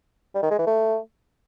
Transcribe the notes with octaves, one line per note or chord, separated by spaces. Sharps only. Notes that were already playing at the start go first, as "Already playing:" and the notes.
G3
D#3
G#3
E3
A3